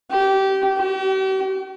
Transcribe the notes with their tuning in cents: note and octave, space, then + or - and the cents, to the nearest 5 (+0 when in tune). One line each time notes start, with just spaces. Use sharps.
G4 -20
G4 -45